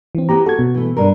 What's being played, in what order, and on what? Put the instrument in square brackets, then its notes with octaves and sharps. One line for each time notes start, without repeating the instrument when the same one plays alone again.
[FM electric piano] E3 C4
[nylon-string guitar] B3 E4 G4 [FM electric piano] A#5
[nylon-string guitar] F#4 [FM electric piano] A4 G#6
[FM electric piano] B2
[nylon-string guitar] E3 A3
G2 A#4